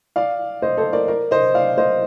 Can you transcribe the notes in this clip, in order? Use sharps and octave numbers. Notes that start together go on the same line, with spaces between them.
D5 F5
C5 D#5
A4 C5
A#4 D5
A#4 D5
C5 D#5
D5 F5
C5 D#5